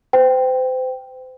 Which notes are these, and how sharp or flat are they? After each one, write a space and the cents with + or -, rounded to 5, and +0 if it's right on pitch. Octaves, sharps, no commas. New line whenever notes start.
C5 -35 G5 +0